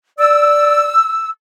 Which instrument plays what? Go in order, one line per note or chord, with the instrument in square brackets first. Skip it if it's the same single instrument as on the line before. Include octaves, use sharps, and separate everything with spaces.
[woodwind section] D5 [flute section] E6